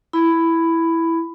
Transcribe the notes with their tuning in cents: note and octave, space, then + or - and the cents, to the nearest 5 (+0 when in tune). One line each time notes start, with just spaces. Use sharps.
E4 +0 B5 +10